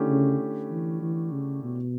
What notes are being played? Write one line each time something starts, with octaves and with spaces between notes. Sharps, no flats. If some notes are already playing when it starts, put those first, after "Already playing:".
Already playing: D3 A3 C#4 E4 G4
C#3
E3
E3
C#3
B2